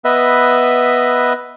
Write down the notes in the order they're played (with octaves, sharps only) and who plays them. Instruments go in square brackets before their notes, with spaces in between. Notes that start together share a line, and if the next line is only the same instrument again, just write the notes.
[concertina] B3 B4 D#5 E5